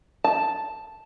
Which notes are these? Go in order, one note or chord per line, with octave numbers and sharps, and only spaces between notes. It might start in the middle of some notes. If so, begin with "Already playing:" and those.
A5